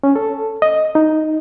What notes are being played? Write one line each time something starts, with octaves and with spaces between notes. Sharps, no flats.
C#4
A4
D#5
D#4